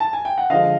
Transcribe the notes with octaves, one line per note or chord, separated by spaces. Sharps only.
A5
G#5
G5
F#5
D3 F3 G#3 D#5 F5